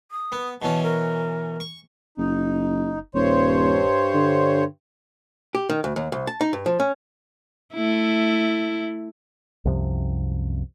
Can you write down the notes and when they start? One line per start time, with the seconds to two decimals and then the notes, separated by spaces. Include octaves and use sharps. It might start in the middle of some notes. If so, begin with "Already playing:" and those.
0.11 D#6
0.32 B3
0.62 B2 E3 C#4 A5
0.83 A#4
1.60 C#6
2.18 F#1 D#4
3.15 D#1 G2 C5 C#5
4.14 D3
5.55 G4
5.69 D#3
5.84 D2
5.96 D#2
6.12 C2
6.27 A5
6.41 D#4
6.53 G2
6.66 F3
6.80 C#4
7.74 A3 E4
9.65 C2 F#2 C3 F3